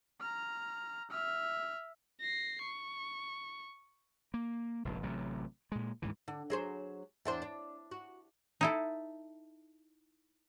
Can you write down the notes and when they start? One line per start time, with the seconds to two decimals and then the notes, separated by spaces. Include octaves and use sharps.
0.20 A#5 F6
1.10 E5 F6
2.21 A#6 C7
2.62 C#6
4.34 A#3
4.85 F1 A#1 G#2
5.03 A1 C3 F#3
5.72 A#2 G#3
6.02 D2 G#2 D3 E3
6.28 D3
6.50 F#3 G#4 C5
7.25 E2 D4 C5
7.42 D4
7.91 F#4
8.61 D#4 E4 A4